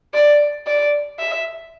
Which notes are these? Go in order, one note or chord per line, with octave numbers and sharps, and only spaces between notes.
D5
D5
E5